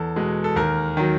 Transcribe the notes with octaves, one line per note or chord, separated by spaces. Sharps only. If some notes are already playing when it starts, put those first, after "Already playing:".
Already playing: E2 A4
B2 G#3
A4
D#2 A#4
D#3 F#3